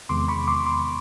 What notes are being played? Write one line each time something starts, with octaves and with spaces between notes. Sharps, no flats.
E2 C3 D#3 G#3 B3 C6 D6
B5 C#6
C6 D6
C6 D6